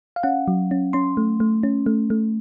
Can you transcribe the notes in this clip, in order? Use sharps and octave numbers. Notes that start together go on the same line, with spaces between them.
F5
C#4 F#5
F#3
C#4
C#4 C6
A3
A3
C#4
A3
A3